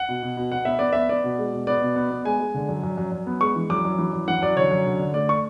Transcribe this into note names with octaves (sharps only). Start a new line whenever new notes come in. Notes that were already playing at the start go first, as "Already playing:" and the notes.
Already playing: F#5
B2
B2
B2
B2 F#5
B3 E5
B3 D5
B3 E5
B3 D5
B2
G#3
B2
B3 D5
B2
B3
B3
G#3 G#5
G#3
D3
F#2
F#2
F#2
F#2
B3
G#3 C#6
E3
F#2 D6
F#2
E3
F#2
E3 F#5
F#2 D5
D3 C#5
F#2
D3
D3
A3 D5
C#6